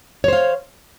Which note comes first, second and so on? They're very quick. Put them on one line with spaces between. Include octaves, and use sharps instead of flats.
C#5 C5 F5